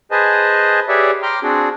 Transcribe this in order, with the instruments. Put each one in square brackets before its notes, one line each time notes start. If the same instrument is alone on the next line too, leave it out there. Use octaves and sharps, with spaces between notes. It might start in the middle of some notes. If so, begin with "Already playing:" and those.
[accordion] G#4 B4 C5 D#5 G#5 A5
G4 G#4 B4 C#5 D5 E5
G5 A#5 C6 D6 F6
C4 D4 F#4 G#4